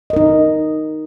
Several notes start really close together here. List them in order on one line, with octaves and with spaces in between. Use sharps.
D#5 A#4 D#4